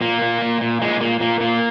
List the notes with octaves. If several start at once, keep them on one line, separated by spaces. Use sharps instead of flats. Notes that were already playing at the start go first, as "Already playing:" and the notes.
A#2 A#3
A#2
A#2
A#2
A#2 G#3
A#2 A#3
A#2 A#3
A#2 A#3